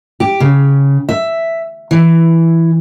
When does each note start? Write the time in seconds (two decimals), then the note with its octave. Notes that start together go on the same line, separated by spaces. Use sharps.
0.20 G4
0.40 C#3
1.09 E5
1.91 E3